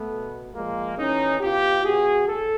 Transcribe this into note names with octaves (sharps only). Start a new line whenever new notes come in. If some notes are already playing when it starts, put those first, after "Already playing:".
Already playing: A3 B3
B2
A#2 F3 G#3 A#3
A2 E3 C#4 D#4
B2 F4 G4
B2 F#4 G#4
A2 A4